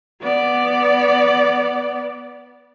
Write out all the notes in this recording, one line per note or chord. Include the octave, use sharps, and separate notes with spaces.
B3 D5